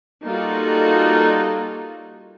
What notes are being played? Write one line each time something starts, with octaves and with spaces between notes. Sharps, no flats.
G3 A#3 D#4 F4 F#4 A4